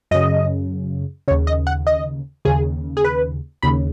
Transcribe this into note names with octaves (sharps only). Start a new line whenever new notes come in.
F#2 C#3 D#5
D#2 C#3 C#5
D#5
F#5
D#5
D#2 C#3 G#4
G#4
B4
D#2 C#3 B5